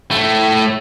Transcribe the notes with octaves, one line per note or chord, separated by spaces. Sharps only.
A2 A3